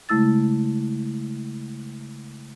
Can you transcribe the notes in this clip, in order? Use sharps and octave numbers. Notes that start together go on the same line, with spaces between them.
C#3 G#3 A3 E4 E6 A6